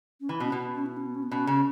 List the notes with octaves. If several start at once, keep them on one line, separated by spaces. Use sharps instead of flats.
C#4
E3 E4
B2 C#4
B2 B3
C#4
E4
C#4
B3
C#4
B3
B2 C#4
C#3